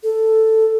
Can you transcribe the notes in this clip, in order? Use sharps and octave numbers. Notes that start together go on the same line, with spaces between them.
A4